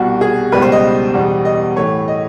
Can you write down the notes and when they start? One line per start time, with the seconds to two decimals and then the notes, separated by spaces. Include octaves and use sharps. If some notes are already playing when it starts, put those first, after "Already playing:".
Already playing: C2 B2 G3 F#4
0.21 G#4
0.52 C#2 B2 G3 B4
0.62 C5
0.72 D#5
1.14 E2 B2 G3
1.45 D#5
1.76 A2 E3 A3 C#5
2.08 D#5